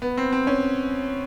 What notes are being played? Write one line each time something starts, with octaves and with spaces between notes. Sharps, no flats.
B3
C4
C4
C#4